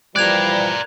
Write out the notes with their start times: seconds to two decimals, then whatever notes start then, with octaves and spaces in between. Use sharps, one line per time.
0.16 E3 F3 G3 A#4 D5 F#6 G#6 F7